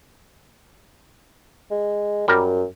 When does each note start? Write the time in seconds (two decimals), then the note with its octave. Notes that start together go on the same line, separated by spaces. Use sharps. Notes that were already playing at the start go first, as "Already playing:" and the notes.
1.71 G#3
2.28 F#2 G3 A#4